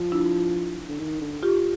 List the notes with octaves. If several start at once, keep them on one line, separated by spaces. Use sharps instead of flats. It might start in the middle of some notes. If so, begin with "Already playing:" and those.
Already playing: F3
D4 E4
D3
D#3
D3
F4 G4